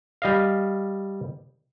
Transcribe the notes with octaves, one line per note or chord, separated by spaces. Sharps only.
G3 D#5 F5